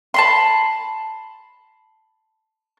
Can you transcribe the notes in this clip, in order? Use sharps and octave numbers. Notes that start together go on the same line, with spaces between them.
A5 B5 C6